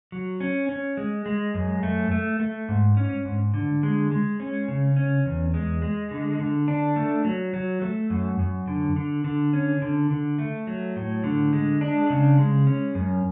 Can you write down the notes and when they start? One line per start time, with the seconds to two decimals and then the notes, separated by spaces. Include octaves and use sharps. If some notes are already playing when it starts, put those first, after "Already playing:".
0.12 F#3
0.40 C#4
0.69 C#4
0.97 G#3
1.26 G#3
1.55 F#2
1.83 A3
2.11 A3
2.40 A3
2.69 G#2
2.97 C#4
3.25 G#2
3.54 D3
3.83 G#3
4.11 G#3
4.40 C#4
4.68 C#3
4.97 C#4
5.26 E2
5.54 G#3
5.82 G#3
6.11 D3
6.39 D3
6.68 D4
6.96 A3
7.25 F#3
7.54 F#3
7.82 A3
8.10 F#2
8.39 F#2
8.68 D3
8.96 D3
9.24 D3
9.53 C#4
9.82 D3
10.10 D3
10.39 A3
10.67 F#3
10.96 A2
11.24 D3
11.53 G#3
11.81 D4
12.10 C#3
12.38 G#3
12.67 C#4
12.95 F#2